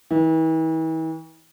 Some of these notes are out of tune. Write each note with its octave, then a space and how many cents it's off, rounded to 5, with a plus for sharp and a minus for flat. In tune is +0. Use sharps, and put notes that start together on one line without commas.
E3 -40